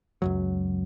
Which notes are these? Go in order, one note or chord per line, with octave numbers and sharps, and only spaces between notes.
C#2 F#2 F#3